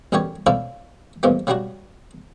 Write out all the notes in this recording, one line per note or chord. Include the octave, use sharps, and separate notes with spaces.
A1 F#2 D3 C#4 G4 C#5
C#4 D4 E4 F4 A4 C5
E2 G2 A#2 F3 G#3 A3
C#3 F#3 G3 D4 F#4